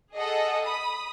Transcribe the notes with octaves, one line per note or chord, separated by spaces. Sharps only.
G#4 A4 D#5 F#5
B5 D#6